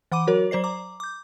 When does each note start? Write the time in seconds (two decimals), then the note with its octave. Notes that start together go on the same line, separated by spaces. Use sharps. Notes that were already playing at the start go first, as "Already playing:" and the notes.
0.12 E3 F#5 B5 D6 D#7
0.27 F#3 F#4 A#4 C#5
0.51 F#3 C5 D5 C7
0.64 A#5 D6
1.00 D6 G6